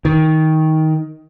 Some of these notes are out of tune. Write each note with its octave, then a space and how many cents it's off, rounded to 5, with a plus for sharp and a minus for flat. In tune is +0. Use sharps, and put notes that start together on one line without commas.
D#3 +15